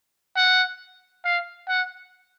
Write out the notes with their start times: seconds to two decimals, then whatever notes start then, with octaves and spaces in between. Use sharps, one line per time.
0.36 F#5
1.25 F5
1.69 F#5